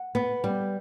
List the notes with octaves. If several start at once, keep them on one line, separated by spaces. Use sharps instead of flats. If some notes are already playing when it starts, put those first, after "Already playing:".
Already playing: F#5
B3
G3